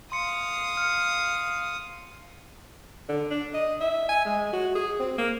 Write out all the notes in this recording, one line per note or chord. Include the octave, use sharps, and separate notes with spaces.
F5 C6 D#6 C#7
F6 C#7
D3
D4
D#5
E5
G#5
G#3
F#4
G#4
C4
A#3